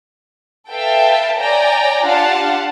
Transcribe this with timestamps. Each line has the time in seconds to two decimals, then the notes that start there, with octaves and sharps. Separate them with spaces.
0.70 A4 B4 E5 F5 G5 A5
1.38 C#5 D5 G5 G#5 A#5
2.05 D4 F4 G4 F5 F#5 A5